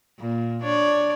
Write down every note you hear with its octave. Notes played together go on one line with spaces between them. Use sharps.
A#2
D4 C#5 D5